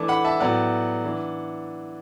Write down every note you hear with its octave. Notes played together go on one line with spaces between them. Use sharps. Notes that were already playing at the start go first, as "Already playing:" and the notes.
Already playing: E3 A3 D4 A5 D6
F#5 B5
E5 A5
A2 F#3 B3 D5 F#5
E3 D4